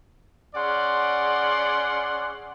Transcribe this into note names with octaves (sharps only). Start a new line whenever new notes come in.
C#4 G#4 D5 F#5 C6